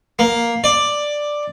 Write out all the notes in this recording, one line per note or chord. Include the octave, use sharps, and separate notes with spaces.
A#3
D5